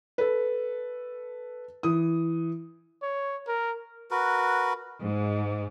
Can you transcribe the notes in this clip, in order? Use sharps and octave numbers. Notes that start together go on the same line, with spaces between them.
A4 B4
E3 D#6
C#5
A#4
F#4 A#4 B4
G#2